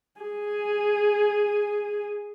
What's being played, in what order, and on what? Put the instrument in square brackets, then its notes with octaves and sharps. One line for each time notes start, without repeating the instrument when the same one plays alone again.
[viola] G#4